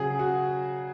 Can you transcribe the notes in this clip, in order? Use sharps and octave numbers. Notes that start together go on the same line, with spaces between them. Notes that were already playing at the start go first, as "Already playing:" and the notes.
Already playing: C#3 F#3 G#4
F#4